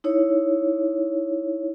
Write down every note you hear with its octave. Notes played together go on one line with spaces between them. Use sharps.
D#4 E4 C#5